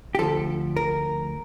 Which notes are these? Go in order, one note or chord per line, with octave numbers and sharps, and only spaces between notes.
G4
D2 D3 F3 A4
A#4